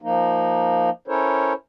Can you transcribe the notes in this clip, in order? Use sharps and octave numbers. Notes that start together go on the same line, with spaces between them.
F3 A#3 D#4
C#4 E4 A4 A#4 C5 C#5